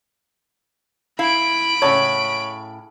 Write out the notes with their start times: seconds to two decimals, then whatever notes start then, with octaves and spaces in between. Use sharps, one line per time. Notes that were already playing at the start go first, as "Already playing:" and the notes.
1.19 E4 F5 B5 D7
1.82 A2 C#3 C#5